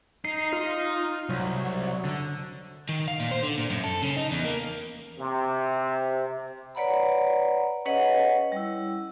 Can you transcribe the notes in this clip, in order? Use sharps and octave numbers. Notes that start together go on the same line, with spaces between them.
D#4 C7
F4
C2 F#3
D3
D#3
F5
A#2
C5
D3
A#2
F#2
A4
C#3
D#4
E2
A#3
C3
B4 C#5 D5 F#5 A#5 B5
C#4 G#4 B4 C#5 D#5 F#5
G3 E4